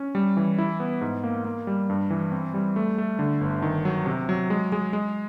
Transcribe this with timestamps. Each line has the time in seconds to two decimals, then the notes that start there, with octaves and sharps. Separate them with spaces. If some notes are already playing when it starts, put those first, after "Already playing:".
Already playing: C#4
0.15 G3
0.37 E3
0.58 E4
0.80 B3
1.01 G#2
1.24 A#3
1.45 A#3
1.67 G3
1.90 G2
2.10 E3
2.32 C4
2.54 G3
2.76 A3
2.98 A3
3.19 D3
3.41 G1
3.62 D#3
3.85 F#3
4.06 C3
4.29 F#3
4.50 G#3
4.72 G#3
4.93 G#3